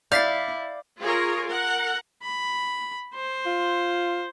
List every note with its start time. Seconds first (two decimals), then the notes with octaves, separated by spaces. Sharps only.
0.12 E4 D5 F5 G6 A6 B6 C7
0.99 F4 G#4 A#4 C#5
1.47 A#4 F#5
2.23 B5
3.14 C5
3.46 F4